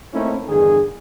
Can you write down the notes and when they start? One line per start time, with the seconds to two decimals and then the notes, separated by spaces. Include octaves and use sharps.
0.13 A3 A#3 C4 C#4 D#4 E4
0.47 E2 G2 D3 D#3 G#4